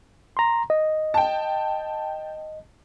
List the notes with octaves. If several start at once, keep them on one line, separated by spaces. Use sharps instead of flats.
A#5 C6
D#5
G5 A5